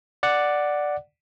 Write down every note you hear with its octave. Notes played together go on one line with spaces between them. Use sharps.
D5 F#5